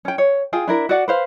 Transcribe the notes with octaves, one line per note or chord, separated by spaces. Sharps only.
C#4 G5
C#5
F4 G#4 G5
D4 E4 A#4
F#4 D5 F#5
B4 C5 F5